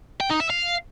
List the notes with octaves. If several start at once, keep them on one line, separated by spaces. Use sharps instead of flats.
G5
D#4
E5
F5